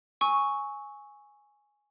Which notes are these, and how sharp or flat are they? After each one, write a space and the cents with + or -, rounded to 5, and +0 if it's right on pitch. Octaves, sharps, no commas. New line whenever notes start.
G#5 +0 C#6 +0 E6 -30